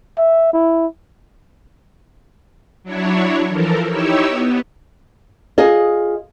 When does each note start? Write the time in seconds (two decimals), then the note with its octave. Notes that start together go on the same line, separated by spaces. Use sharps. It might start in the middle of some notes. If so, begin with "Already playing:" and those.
0.18 E5
0.53 E4
2.84 F#3 D4 E4 C#5
3.49 E3 F3 A4 A#4
3.88 D#4 E4 G4 C#5 E5
4.26 B3
5.58 F4 G#4 D#5